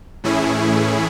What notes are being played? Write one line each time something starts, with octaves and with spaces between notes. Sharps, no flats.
A2 E3 A3 C#4 E4 G#4